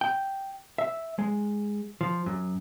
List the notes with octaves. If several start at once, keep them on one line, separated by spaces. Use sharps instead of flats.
G5
E5
G#3
F3
F#2